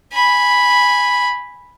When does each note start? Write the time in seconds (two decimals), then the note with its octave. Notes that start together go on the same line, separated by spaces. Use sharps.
0.13 G#5 B5